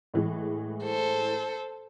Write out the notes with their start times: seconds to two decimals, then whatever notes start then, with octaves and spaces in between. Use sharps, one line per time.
0.14 A2 E3 G#3
0.84 A4 C5